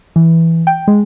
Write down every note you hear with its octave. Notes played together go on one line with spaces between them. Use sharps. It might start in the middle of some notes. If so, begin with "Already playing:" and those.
E3
G5
G#3